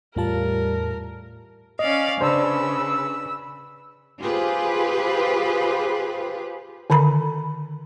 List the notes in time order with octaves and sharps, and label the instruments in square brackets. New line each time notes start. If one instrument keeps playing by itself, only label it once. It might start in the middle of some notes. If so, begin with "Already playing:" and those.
[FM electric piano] E2 F4 A5 [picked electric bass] A2 [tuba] G3 [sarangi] A#4
[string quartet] C#4 D5 F5 [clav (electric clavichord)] D#5
[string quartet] C#3 [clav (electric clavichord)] D4 C5 [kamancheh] B4 E6
[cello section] F4 G4 G#4 B4 C5
[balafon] D3 D#3 A#5 B5